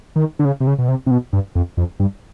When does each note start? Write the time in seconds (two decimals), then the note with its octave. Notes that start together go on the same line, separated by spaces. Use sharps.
0.16 D#3
0.39 D3
0.45 C#3
0.60 C3
0.67 C#3
0.79 B2
0.88 C3
1.06 C3
1.11 B2
1.33 G2
1.55 F2
1.77 F2
2.00 G2